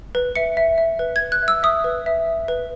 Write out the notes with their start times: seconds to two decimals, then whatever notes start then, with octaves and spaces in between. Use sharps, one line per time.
0.15 B4
0.36 E5 C#7
0.57 E5
0.78 E5
0.99 B4
1.16 G#6
1.21 B4
1.32 F#6
1.42 E5
1.48 E6
1.63 E5 D#6
1.84 B4
2.06 E5
2.26 E5
2.48 B4